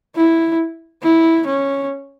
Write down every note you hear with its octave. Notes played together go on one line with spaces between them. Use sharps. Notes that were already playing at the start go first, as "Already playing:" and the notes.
E4
E4
C#4